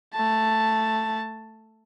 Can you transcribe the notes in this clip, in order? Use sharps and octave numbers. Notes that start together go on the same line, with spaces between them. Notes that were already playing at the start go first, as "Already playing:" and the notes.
A3 A5